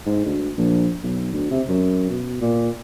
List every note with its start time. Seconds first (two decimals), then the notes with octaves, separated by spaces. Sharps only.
0.06 G#2
0.25 D2
0.58 A#1
1.03 B1
1.33 D2
1.51 C3
1.69 F#2
2.10 B2
2.41 A#2